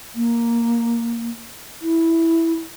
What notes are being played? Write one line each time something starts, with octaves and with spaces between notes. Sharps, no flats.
A#3
E4